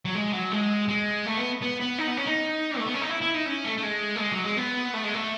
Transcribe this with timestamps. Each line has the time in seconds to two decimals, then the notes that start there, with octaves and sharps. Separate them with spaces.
0.05 F#3
0.15 G#3
0.33 F#3
0.51 G#3
0.88 G#3
1.26 A3
1.37 B3
1.62 B3
1.80 B3
1.98 D#4
2.08 B3
2.17 C#4
2.26 D#4
2.78 A3
2.86 B3
2.94 C#4
3.01 D#4
3.09 E4
3.21 E4
3.34 D#4
3.46 C#4
3.64 A3
3.78 A3
3.83 G#3
4.16 A3
4.20 G#3
4.32 F#3
4.44 G#3
4.57 B3
4.94 A3
5.04 G#3
5.14 A3